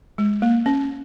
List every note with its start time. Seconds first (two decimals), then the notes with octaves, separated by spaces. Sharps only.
0.18 G#3
0.42 A#3
0.66 C#4